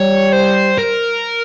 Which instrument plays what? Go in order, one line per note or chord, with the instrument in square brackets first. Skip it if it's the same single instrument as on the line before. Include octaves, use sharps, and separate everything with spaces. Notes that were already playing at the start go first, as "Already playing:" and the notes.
Already playing: [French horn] G3 [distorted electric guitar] C#5
[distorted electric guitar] C5
A#4